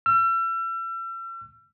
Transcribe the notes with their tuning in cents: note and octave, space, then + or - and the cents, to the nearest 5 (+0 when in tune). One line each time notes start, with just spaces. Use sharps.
E6 +40